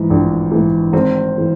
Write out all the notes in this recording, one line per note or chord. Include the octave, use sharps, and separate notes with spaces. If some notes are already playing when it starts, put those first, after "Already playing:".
Already playing: G#2 E3
A#1
G#2 E3
G#1 C4
E3